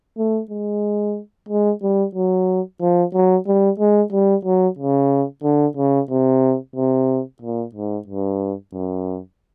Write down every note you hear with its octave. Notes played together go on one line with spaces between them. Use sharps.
A3
G#3
G#3
G3
F#3
F3
F#3
G3
G#3
G3
F#3
C#3
D3
C#3
C3
C3
A#2
G#2
G2
F#2